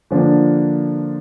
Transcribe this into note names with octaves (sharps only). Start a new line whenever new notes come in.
D3 F3 A#3 D4